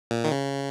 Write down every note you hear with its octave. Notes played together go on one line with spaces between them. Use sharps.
A#2
D#3
C#3